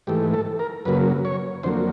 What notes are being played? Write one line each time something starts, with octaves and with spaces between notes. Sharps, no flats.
G#2 E3 A3 G4
A4
A#4
F#2 C#3 F#3 A#3 B4
C#5
F2 D3 F#3 A#3 C5